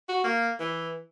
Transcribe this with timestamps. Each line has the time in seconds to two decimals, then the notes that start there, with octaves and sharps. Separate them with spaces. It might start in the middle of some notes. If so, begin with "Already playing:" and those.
0.09 F#4
0.24 A#3
0.60 E3